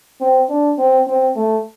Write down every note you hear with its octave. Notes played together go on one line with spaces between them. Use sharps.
C4
D4
C4
C4
A3